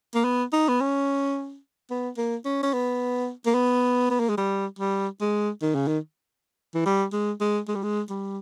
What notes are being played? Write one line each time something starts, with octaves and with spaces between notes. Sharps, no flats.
A#3
B3
D#4
B3
C#4
B3
A#3
C#4
C#4
B3
A#3
B3
B3
A#3
G#3
G3
G3
G#3
D#3
C#3
D#3
E3
G3
G#3
G#3
G#3
G3
G#3
G3